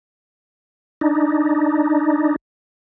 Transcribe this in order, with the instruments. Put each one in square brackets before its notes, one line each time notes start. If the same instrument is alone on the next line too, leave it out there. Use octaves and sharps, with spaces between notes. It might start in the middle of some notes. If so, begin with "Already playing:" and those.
[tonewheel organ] D4 D#4